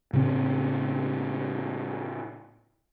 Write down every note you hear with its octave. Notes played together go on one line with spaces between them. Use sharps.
A2 C#3 C4